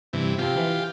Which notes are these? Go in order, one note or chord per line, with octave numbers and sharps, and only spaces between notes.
G2 C3 E3
C3 F3 C4 F4 G4
E3